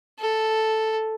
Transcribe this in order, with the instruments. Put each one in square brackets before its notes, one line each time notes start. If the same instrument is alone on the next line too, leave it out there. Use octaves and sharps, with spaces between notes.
[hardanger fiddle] A4